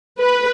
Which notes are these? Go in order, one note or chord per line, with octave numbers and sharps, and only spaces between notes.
B4